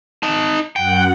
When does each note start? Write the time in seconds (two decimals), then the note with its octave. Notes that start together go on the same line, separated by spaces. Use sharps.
0.23 D#4 A5
0.76 F#2 F#5 G5